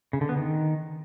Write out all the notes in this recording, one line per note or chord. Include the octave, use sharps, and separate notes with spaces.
C#3
D3
B3
D#3